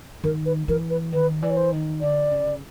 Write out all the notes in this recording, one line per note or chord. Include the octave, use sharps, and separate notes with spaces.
D#3 A#4
B4
E3 A#4
B4
D#3 B4
E3 D5
C#5
C5
D#3
D3 D5
C#3